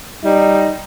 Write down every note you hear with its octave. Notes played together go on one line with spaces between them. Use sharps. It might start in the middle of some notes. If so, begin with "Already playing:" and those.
G3 D#4